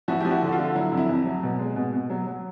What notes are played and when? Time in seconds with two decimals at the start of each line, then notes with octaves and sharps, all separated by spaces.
0.08 F3 E4 F#4
0.21 F3 G4
0.31 E4 F#4
0.42 D3
0.48 F#4
0.52 F4
0.58 D3
0.75 F#3 E4
0.92 F2
0.97 E4
1.09 F2
1.25 F#3
1.43 B2
1.59 G#3
1.76 B2
1.93 B2
2.10 F#3
2.27 F#3